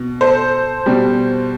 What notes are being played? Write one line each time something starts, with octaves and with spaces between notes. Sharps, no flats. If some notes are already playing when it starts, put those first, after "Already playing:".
Already playing: B2
A4 C5
B2 G3